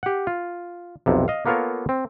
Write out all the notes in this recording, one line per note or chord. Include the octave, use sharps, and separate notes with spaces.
G4 F#5
F4
B1 F2 C3
D#5 F5
A#3 B3 F4 A4 A#4 C#5
C4